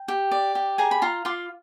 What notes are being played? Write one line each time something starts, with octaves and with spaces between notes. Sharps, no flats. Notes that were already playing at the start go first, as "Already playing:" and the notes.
Already playing: G5
G4
D5
G4
G#4 G#5 A#5
B5
F4 A#5 C6
F4 C6 D6